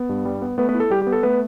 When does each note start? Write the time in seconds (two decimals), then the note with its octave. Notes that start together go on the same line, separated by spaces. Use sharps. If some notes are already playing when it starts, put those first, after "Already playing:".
Already playing: B3
0.09 G2
0.25 G3
0.42 B3
0.58 A3 B3 B4
0.69 B3 B4
0.74 E4
0.80 A4
0.90 G3 G4
1.02 G4
1.07 B3
1.12 A4
1.23 A3 B3 B4